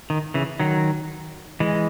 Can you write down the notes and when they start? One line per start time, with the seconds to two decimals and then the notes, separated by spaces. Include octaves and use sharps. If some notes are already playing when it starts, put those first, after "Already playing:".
0.10 D#3
0.34 C#3 E3
0.60 D#3 F#3
1.60 E3 G#3